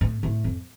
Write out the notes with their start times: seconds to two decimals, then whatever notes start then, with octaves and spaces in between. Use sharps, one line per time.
0.01 A2
0.23 A2
0.44 F2